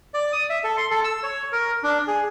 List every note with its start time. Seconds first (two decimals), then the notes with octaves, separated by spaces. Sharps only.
0.14 D5
0.33 D#6
0.50 E5
0.64 A4
0.77 C6
0.91 A4
1.04 E6
1.23 C#5
1.52 A#4
1.83 D4
2.08 G#4